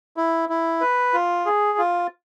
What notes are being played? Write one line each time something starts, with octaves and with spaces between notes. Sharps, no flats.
E4
E4
B4
F4
G#4
F4